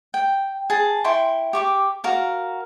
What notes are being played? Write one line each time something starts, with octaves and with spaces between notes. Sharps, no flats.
G5
G#4 A5
E4 G5 C6 C#6
G4 C#6 D6
F#4 A#4 F5